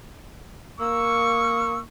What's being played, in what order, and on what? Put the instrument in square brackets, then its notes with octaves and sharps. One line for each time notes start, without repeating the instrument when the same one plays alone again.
[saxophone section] A#3 [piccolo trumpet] C#6 [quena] E6